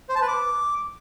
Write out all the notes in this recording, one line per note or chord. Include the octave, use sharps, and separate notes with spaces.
C5
A5
B4
D6